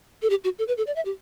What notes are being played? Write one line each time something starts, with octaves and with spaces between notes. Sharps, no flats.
A4
G4
F#4
A4
B4
A4
D5
E5
G4